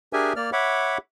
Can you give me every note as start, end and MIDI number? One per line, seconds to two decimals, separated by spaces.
0.13 0.33 62
0.13 0.33 67
0.13 0.33 68
0.13 0.33 70
0.13 0.33 76
0.13 0.33 80
0.36 0.50 58
0.36 0.50 74
0.36 0.50 89
0.53 0.98 73
0.53 0.98 76
0.53 0.98 78
0.53 0.98 83
0.53 0.98 86